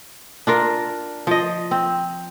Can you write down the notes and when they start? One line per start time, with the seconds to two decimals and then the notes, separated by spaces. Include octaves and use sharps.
0.47 D4 F4 A#4
1.27 F3 D#5
1.71 C4